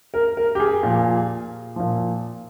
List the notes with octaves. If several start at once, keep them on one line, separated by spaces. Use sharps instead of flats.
A#4
A#4
G4
G#4
A#2 F3
A#2 F3